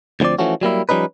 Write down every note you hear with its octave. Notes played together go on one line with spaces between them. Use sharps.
D2 D3 F3 C4 D5
E3 F3 A3 C#4 F#4
F#3 G3 A#3 E4
F3 G3 C#4 D#4 B4